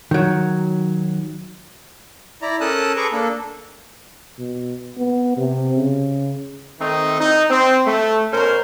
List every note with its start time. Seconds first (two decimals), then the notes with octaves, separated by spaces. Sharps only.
0.11 D#3 F#3
2.42 E4 D5 A#5
2.61 C#4 A4 A#4 A5 D#6 F#6
2.96 G#4 A4 B4 A#5 C#6 D6
3.12 A#3 D4 A4
4.39 B2
4.97 B3
5.37 C3
5.77 C#3
6.79 D#3 A3 C4 D#4
7.19 D#4
7.50 C4
7.85 A3
8.31 B2 C#4 A#4 C5